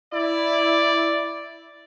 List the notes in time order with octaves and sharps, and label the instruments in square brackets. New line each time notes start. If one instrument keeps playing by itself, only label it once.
[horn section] E4 D5